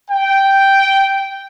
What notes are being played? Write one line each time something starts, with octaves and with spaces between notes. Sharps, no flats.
G5